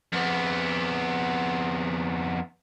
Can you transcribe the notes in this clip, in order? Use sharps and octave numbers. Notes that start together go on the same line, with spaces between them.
F2 B3